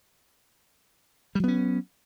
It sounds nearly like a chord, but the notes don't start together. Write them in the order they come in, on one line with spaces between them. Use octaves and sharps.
G3 F#3 B3 C#4